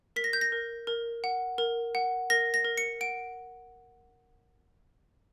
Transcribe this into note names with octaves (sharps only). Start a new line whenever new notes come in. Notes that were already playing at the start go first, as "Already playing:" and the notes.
A#4 B6
A#6
G6
A#6
A#4
A#4
F#5
A#4
F#5
A#4 A#6
A#6
A#4
C#7
F#5 D7